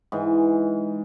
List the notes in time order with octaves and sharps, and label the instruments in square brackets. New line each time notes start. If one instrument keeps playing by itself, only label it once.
[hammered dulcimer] G#2 E3